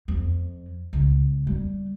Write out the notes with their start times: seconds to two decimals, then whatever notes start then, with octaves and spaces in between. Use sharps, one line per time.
0.08 F2
0.93 C#2
1.47 G3